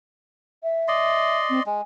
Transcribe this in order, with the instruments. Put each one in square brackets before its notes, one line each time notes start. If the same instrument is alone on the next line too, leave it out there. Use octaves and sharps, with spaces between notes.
[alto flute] E5
[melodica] D5 D#5 C6
[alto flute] C4
[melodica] G#3 [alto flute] G#5